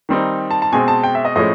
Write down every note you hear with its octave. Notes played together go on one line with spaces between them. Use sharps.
D#3 G3 C4 D#4
A5
A5
B2 G#3 C4 G#5
A5
G5
E5
D#5
A2 F3 G#3 C#4 D#5